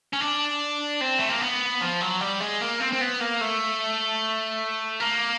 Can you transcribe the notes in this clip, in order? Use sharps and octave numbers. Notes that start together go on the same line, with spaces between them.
C#4
D4
C4
A3
A#3
B3
F3
F#3
G3
G#3
A#3
C4
C4
B3
A#3
A3
A#3